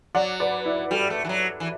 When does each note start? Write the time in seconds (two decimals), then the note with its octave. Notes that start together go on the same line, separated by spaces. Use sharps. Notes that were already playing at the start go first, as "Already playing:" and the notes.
0.15 F#3 D5 F#5
0.40 B4 D5
0.65 E4
0.91 G3 F#4 A4
1.10 A3
1.25 E3
1.29 F#3
1.60 E3